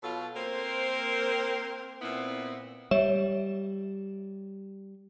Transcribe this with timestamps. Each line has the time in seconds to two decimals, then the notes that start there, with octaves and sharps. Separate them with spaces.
0.02 B2 F#3 F4 A4
0.34 A#3 C4 A#4 C5
2.02 A#2 B3 C4 E4
2.91 G3 C#5 E5 E7